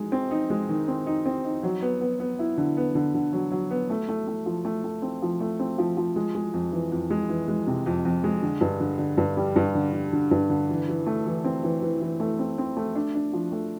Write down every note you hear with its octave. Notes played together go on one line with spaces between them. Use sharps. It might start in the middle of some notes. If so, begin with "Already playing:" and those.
Already playing: G#3 D#4
C4
D#4
G#3
D#3
C4
D#4
C4
D#4
F#3
B3
B3
B3
E4
D3
B3
D3
D3
F#3
F#3
B3
A3
A3
A3
F3
A3
A3
C4
F3
A3
C4
F3
F3
G#3
G#3
F2
E3
F2
G#3
E3
G#3
C3
F2
F2
G#3
D3
G2
D3
D3
G2
G3
G2
D3
D3
D3
G2
D3
E3
E3
A3
E3
C4
E3
E3
E3
A3
C4
C4
A3
D4
D4
F3
A3